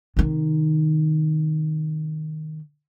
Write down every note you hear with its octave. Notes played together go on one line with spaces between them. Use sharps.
C3 D#3